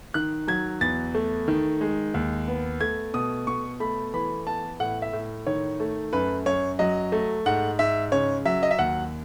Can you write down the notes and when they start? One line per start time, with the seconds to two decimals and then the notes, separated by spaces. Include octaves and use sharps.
0.14 D#3 F#6
0.48 F#3 G#6
0.81 E2 A6
1.15 A3
1.48 D#3
1.81 G#3
2.14 D#2
2.48 B3
2.81 A3 G#6
3.14 B2 D#6
3.47 B2 C#6
3.80 A3 B5
4.14 E3 B5
4.47 B3 A5
4.80 A2 F#5
5.02 E5
5.13 A2
5.47 D#3 C#5
5.80 A3
6.13 F#2 B4
6.46 F#2 C#5
6.79 F#3 D#5
7.12 A3
7.46 G#2 F#5
7.79 G#2 E5
8.12 C#3 C#5
8.45 F#3 E5
8.63 D#5
8.71 E5
8.79 D#2 F#5